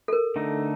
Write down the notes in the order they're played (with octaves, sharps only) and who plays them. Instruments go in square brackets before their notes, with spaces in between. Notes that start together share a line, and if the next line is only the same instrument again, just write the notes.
[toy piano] A4
A#4
[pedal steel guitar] D3 A3 D#4